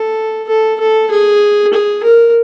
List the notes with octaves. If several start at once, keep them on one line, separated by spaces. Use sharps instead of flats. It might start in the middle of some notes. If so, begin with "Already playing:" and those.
Already playing: A4
A4
A4
G#4
G#4
A#4